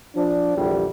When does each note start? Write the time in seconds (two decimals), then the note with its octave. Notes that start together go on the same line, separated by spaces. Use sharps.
0.16 F3 D4
0.57 A#1 E2 D3 G3 G4